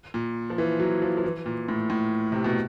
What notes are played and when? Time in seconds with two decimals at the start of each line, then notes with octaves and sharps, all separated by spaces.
0.14 A#2
0.50 F3
0.58 E3
0.80 F#3
1.02 F3
1.17 F3
1.24 E3
1.46 A#2
1.68 A2
1.90 A2
2.32 C3
2.44 B2